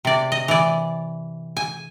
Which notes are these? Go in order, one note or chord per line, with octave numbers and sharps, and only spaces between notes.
C3 D5
D#5
E3 D5
G#5